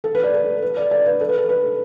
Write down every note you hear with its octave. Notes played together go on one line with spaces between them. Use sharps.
A4
B4
D5
A4
B4
D5
D5
B4
A4
B4
A4
B4